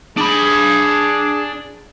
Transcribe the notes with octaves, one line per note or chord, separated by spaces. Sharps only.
D4 G#4 B5